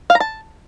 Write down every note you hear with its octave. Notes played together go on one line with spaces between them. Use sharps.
F5
A#5
A5